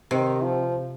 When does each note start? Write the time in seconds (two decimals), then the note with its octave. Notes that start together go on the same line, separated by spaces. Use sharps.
0.11 C3 D#3
0.43 F3